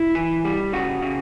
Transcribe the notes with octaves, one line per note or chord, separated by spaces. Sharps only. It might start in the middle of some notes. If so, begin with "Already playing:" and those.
Already playing: E4
E3
G3
C#3 F#4
C#3